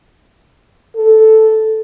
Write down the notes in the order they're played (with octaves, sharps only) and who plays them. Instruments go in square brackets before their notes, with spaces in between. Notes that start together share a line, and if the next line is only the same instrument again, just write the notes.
[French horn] A4